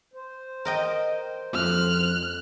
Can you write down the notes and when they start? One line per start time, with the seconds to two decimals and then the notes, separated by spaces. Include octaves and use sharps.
0.14 C5
0.65 A#4 D#5 G5
1.54 F2 F6 F#6